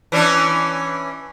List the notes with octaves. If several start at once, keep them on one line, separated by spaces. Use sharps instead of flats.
E3 C#4 D4